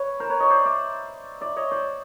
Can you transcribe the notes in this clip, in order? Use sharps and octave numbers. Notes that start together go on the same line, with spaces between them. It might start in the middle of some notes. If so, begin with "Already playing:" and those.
Already playing: B4 C#5
A#4 C5
B4 C#5
C#5 D#5
C5 D5
D5 E5
D5 E5
C#5 D#5
C5 D5